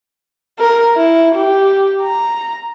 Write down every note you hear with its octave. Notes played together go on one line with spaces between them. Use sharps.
A#4
E4
G4
A#5